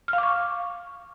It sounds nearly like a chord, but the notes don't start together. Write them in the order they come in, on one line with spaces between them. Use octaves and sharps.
F6 F5 D6 C#6